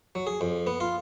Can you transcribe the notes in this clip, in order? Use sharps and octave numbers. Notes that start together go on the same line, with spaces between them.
F#3
G#4
F2
B3
F4